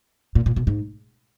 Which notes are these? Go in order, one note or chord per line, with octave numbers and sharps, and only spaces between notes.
A#2
A#2
B2
G#2